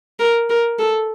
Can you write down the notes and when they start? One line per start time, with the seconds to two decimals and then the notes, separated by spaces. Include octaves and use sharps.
0.19 A#4
0.49 A#4
0.79 A4